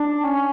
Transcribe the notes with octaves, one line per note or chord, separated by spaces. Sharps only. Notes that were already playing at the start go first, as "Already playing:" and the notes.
Already playing: D4
C#4